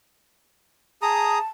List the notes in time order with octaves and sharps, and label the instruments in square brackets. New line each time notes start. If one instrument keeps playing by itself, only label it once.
[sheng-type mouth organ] G#4 A#5 D#6 [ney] A5